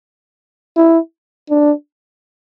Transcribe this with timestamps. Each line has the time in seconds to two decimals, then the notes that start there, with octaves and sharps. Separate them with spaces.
0.77 E4
1.50 D4